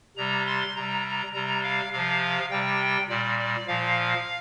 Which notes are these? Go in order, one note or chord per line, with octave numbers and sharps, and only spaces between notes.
C3 G3 A#5
C6
C3 G3 A#5
C3 G3 A#5
F5
C3 F3 F5
C3 G3 G5
A#2 G3 D5
D5
A#2 F3 F5